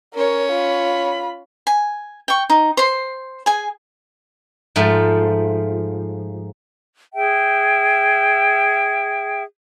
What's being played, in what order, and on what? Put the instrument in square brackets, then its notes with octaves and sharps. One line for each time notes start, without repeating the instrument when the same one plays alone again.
[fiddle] C#4 C#5 [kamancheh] A#4
[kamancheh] F4 B5
[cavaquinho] G#5
G5 C#6
D#4
C5 C6
G#4 G#5
[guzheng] G#2 F3 A3
[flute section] G#4 E5 G5